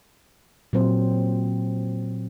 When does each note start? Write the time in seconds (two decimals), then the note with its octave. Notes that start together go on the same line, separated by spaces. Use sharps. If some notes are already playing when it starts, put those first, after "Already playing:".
0.73 A#2 F#3 C4 C5